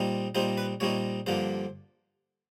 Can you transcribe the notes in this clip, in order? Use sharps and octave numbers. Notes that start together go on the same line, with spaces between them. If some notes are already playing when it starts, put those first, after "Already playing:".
Already playing: A#2 G3 C4 D#4
A#2 G3 C4 D#4 C5
B4
A#2 G3 C4 D#4 C#5
G2 D3 F3 A#3 C5